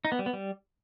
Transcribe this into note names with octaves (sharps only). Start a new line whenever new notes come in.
D#4
B3
G3
B3
G3